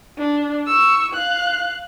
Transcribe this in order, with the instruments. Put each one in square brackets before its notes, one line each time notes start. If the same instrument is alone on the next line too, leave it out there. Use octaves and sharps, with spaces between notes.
[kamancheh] D4
C#6 E6
F5 F#6